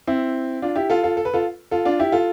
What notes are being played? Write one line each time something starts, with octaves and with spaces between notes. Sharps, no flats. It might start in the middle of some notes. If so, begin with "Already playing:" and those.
C4 E4
D4 F4
E4 G4
F4 A4
F4 A4
A4
B4
F4 A4
F4 A4
D4 F4
E4 G4
F4 A4